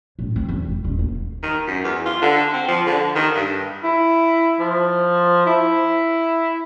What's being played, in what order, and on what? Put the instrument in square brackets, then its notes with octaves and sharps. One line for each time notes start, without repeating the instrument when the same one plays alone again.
[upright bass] A2
C4
E2
F1
D#1
A#3
[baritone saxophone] D#3
F#2
E2
F4
D3
C4
F3
D3
D#3
G2
[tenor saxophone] E4
F3
E4